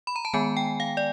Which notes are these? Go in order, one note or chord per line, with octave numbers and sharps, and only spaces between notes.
B5
A#5
A5
D#3 G#3 B3 G#5
G5
F5
D5